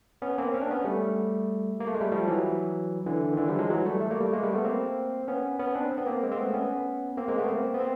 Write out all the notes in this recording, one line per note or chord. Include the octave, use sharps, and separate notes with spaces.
B3 C#4
A#3 C4
C#4
D4
B3 C#4
G3 A3
A#3
A3
G#3
G3 A3
F3 G3
E3 F#3
D3 E3
D#3
D3 E3
F3 G3
F#3 G#3
E3 F#3
G3 A3
A3
A#3
G3 A3
G#3 A#3
G3 A3
A3 B3
A#3 C4
B3 C#4
B3 C#4
C4 D4
B3
A#3 C4
G#3 A#3
C4
A3 B3
B3 C#4
A#3 C4
G#3 A#3
A3 B3
A#3 C4
B3
C4